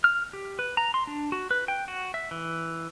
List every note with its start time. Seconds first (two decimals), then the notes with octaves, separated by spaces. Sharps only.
0.04 F6
0.33 G4
0.59 B4
0.77 A#5
0.94 C6
1.07 D4
1.32 F#4
1.51 B4
1.68 G5
1.88 F#4
2.14 E5
2.31 E3